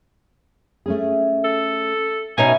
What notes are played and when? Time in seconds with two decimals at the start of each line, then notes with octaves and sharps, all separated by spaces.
0.86 A3 C#4 G#4
1.45 A4
2.38 B2 C#4 D#4 E5 G#5